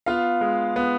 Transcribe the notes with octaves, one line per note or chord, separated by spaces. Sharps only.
B3 F4 F5
G#3
B3